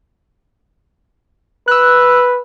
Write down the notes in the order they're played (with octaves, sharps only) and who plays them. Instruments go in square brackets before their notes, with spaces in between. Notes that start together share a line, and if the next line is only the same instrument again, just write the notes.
[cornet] B4 [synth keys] E6 F#6